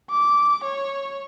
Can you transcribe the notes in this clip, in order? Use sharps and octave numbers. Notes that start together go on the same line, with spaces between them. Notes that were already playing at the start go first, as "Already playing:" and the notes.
D6
C#5